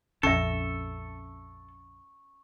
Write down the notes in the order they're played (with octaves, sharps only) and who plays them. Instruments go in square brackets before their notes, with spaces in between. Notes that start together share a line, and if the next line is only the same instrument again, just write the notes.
[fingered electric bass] A#1 F2 [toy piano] C#4 E5 [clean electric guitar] A4 [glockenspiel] C#6